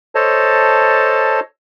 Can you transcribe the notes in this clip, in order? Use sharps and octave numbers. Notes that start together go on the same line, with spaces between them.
A4 C5 C#5 D#5 A5